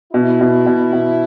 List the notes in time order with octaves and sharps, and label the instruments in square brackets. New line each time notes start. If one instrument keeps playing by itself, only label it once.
[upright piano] B2 [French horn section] E4
[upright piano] B2
B2
B2